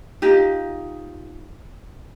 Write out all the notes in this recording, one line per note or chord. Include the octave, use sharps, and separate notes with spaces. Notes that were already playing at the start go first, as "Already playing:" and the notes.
D#4 F4 G4